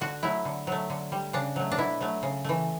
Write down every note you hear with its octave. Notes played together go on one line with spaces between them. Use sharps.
D3 F#4
F#3 A3 E4
D3
F#3 A3
D3
G3
C#3 D4
F#3 A3
D4
B2 E4
F#3 A3
C#3
E3 A3